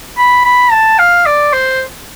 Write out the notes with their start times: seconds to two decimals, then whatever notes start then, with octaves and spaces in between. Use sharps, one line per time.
0.18 B5
0.45 B5
0.72 A5
0.98 F5
1.26 D5
1.53 C5